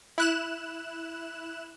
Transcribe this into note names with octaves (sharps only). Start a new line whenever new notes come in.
E4 F#6 E7